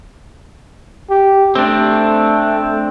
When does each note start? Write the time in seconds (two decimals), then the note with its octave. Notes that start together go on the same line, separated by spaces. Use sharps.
1.10 G4
1.55 A3 C4 D4